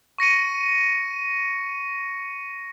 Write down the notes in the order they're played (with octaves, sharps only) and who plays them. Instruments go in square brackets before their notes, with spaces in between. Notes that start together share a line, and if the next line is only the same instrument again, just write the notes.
[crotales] C#6 A#6 C#7 D#7